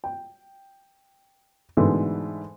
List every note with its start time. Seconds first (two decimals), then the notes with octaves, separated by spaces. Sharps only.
0.04 G5
1.77 G#2 B2 D3 E3 A3